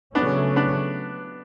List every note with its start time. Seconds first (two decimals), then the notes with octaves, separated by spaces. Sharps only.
0.15 C#3 F#3 A3 B3 C#4 D4
0.56 B3 D4